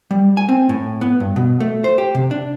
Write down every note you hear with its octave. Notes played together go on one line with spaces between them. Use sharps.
G3
G#5
C4
A2
B3
G2
B2
A3
C5
G4
C3
D4